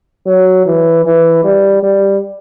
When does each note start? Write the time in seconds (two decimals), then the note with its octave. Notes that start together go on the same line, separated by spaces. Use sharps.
0.27 F#3
0.66 E3
1.05 E3
1.44 G3
1.83 G3